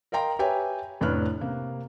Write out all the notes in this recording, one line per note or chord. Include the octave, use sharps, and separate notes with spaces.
A#4 D#5 F5 G5 A#5 C6
G4 B4 C#5 E5 G5 G#5
F1 A2 D4 B4 F6 F#6
C3 A#3